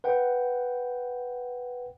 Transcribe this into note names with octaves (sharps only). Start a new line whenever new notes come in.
B4 F#5 G5